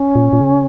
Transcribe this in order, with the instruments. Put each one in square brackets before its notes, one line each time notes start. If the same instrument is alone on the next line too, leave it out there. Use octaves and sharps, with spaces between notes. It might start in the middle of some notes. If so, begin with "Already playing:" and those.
Already playing: [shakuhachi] C#4
[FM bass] A#2
A#2
C#3